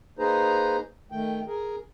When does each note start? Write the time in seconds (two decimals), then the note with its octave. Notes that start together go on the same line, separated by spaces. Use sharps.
0.19 A#3 D#4 G#4 B4 C5 A#5
1.12 D#3 A3 G5
1.47 G#4 A#4